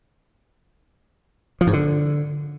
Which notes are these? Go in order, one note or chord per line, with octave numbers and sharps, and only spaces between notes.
F3
G#2
D3